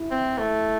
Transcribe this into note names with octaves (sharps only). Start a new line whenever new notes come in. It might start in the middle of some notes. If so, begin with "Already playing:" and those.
Already playing: E4
C4
A3